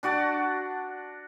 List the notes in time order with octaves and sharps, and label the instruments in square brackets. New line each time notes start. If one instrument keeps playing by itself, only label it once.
[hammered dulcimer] D4 F#4 D5 A5